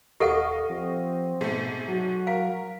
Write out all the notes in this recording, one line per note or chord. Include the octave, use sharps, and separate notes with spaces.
D#1 G4 A4 D#5 F5 F#5 C#6
F3 C4
G#2 B2 A3
F#3 F#4
A#4 F5